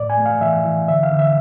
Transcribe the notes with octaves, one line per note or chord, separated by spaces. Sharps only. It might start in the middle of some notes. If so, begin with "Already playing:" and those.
Already playing: A2 D5
G#5
A3
F5
E3 E5
E3
D3 E5
F5
D3
E5